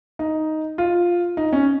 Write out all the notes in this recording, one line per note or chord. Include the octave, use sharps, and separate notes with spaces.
D#4
F4
D#4
C#4